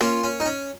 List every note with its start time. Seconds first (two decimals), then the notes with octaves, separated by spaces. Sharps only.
0.01 A#3 C#4 F4
0.24 C#4
0.40 D#4
0.45 C#4